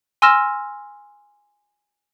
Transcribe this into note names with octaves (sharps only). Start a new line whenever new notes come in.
G#5 C6 E6 F6 A#6 E7